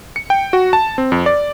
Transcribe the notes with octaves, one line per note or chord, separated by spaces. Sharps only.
C#7
G5
F#4
A5
C4
F2
D5